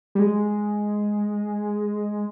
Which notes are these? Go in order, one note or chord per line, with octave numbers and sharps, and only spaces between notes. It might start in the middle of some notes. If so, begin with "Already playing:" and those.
G3
G#3